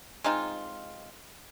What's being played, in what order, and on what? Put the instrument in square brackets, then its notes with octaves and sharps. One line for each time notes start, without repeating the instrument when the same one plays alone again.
[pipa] G#3 C4 D#4 F4